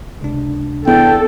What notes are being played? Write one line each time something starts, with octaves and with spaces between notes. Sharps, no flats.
C#2 C3 D4
E2 A4 G5